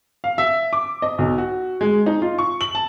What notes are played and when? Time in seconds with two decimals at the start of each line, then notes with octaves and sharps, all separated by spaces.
0.24 F5
0.38 E5
0.73 D6
1.02 D#5
1.18 B1
1.38 F#4
1.81 G#3
2.06 D#4
2.22 F4
2.38 C#6
2.61 F#7
2.75 A5